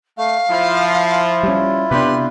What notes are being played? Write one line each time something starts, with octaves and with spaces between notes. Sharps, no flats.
A3 F5
F3 E4 F4
G3 C#4
C3 B3 D4 G4 B4 C6